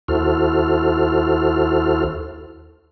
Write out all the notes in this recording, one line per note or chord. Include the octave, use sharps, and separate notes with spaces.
D#2 E4 F#4 A4 C5 F6